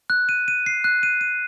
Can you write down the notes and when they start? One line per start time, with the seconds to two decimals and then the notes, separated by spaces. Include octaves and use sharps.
0.10 F#6
0.29 D#7
0.48 D#7
0.66 C7
0.84 F#6
1.03 D#7
1.21 D#7